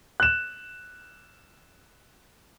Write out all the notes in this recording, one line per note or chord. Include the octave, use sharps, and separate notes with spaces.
F#6 E7